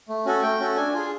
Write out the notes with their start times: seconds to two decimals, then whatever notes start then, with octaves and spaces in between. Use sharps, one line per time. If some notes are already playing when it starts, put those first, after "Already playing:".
0.09 A3
0.25 C#4 F#4 A4
0.43 A3 G5
0.60 C#4 F#4 A4
0.76 D4 G#5
0.93 F4 G#4 G#5